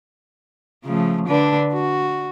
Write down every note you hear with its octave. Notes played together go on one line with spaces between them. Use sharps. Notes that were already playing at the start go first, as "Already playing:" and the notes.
C#3 F3 A3
D3 D4 B4
F#4